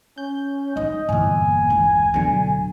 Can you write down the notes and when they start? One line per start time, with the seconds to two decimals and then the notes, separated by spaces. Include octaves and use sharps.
0.18 C#4 G6
0.76 A1 D#4 D#5
1.09 G1 E2 A#2 A#3 G#5
1.70 C#2 E3
2.14 D1 B2 D3 F#3